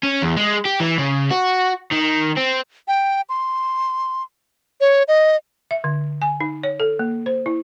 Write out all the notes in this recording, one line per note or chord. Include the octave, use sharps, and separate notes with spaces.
C#4
E2
G#3
G4
E3
C#3
F#4
D#3
C4
G5
C6
C#5
D#5
E5
D3
G#5
D#4
C#5
A4
A#3
C5
E4